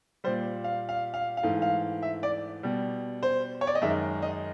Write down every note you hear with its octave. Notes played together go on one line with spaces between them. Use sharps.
A#2 G3 C5
F5
F5
F5
F5
G#2 E3 A3
F5
E5
D5
B2 G3
C5
C#5
D5
D#5
F#2 D#3 G#3 E5
D#5